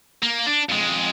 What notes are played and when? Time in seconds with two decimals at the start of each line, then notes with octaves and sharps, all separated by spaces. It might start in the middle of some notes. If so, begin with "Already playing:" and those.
0.22 A#3
0.47 D4
0.69 F2 G#3